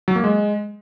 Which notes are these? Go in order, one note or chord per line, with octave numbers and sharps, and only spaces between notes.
F#3
A#3
G#3